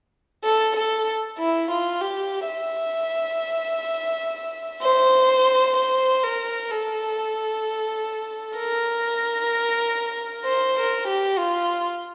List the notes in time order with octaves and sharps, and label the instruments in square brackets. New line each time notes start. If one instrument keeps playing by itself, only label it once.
[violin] A4
A4
E4
F4
G4
E5
C5
C5
A#4
A4
A#4
C5
A#4
G4
F4